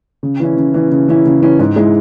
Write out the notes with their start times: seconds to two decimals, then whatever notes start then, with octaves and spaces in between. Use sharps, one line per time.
0.23 C#3
0.40 E3 C#4 E4
0.57 C#3
0.74 E3 C#4 E4
0.92 C#3
1.08 E3 C#4 E4
1.26 C#3
1.42 E3 C#4 E4
1.59 G#2
1.76 G#3 E4